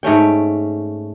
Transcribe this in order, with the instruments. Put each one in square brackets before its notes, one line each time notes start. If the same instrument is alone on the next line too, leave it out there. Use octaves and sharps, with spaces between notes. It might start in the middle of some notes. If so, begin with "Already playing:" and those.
[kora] G#2 A3 C#4 G5